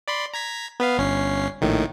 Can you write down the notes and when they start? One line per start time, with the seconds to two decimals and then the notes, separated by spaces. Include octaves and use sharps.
0.08 D5 B5 C6
0.34 A#5 G#6 B6
0.80 B3 B4 F5
0.97 G1 C#4 C7
1.61 A#1 A2 D#3